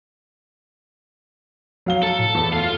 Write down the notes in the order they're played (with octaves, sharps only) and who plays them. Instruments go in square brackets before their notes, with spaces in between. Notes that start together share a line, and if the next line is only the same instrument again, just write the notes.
[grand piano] F#3 F5 G7
[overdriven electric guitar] A4
[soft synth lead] A2
[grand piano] E2
[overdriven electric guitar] F4 F5